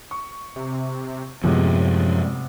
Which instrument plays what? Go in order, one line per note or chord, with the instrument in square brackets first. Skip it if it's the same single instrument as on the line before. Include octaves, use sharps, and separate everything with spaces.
[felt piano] C#6
[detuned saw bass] C3
[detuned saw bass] F#2 [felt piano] A2 C3 B3 [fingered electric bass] F3 G#3